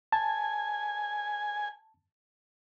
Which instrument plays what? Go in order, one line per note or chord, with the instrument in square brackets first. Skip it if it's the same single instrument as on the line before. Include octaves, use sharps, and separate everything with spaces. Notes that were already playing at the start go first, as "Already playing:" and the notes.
[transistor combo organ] G#5 [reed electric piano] A5